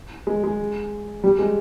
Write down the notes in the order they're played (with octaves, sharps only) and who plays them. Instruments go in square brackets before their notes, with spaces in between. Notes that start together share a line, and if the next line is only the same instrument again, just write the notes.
[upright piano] G#3
G#3
G3
G#3